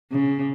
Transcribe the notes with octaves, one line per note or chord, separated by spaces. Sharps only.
C#3